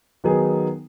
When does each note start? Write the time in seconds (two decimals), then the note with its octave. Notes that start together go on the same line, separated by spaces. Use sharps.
0.24 D#3 F#3 B3 D#4 G#4